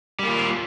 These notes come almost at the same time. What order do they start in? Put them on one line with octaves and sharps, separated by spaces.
G3 A#3 F4